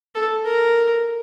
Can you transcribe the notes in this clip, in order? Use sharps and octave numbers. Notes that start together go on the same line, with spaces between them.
A4
A#4